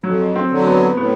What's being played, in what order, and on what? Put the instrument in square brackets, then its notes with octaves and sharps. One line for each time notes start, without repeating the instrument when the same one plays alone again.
[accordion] F2 [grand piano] F#3
[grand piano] C4
[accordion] D3 F#3
[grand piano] B3
[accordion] A2 [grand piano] B3